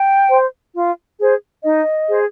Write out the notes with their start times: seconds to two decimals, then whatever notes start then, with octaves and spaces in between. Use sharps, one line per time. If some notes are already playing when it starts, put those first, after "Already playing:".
Already playing: G5
0.28 C5
0.73 F4
1.19 G#4 C5
1.63 D#4 D#5
2.08 G#4 C5